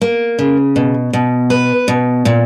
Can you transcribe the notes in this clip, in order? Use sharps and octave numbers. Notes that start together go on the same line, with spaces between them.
A#3
C#3
B2
B2
B4
B2
A#2